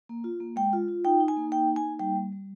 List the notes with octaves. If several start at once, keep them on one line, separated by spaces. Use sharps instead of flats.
A#3
F4
A#3
G#3 G5
F4
F4
D#4 G5
D#4
G#5
A#3
D#4 G5
D#4
G#5
A#3
G3 G5
G3
G3